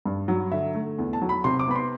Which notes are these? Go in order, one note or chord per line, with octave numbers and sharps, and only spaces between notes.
G2
F#3
D3 E5
A3
E2
A5
F#3
B5
C3 C6
D6
B3 B5
C6